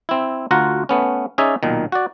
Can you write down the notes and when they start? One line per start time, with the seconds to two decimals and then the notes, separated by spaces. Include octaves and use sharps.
0.09 C4 E4
0.51 D2 F4 F#4 F#5 A#5
0.89 A3 B3 C#4
1.38 C#4 D#4 G#4 D5 E5 G#5
1.63 B1 A#2 D#3
1.92 F#4 D5